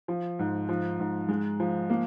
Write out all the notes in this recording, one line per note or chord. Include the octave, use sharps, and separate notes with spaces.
F3
G#2
F3
G#2
G#3
F3
A#3